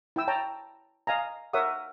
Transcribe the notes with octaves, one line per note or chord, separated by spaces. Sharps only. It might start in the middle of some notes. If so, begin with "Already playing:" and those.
E4 G5 E6
C#5 G5 A5 A#5
D#5 F5 G#5 A#5
A#4 C#5 E5 F#5 D#6